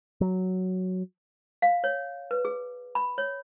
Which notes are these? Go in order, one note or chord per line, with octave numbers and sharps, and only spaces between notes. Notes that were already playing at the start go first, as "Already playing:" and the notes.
F#3
F5
C#5
B4
G#4
B5
C#5